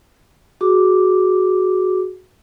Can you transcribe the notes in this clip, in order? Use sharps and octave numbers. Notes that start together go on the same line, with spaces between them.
F#4 G#4 D6